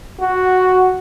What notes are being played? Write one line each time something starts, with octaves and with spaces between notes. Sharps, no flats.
F#4